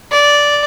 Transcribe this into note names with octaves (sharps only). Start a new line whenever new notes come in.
D5